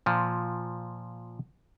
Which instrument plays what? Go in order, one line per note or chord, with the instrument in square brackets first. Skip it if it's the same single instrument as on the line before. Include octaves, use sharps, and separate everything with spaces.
[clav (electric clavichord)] A#2 F3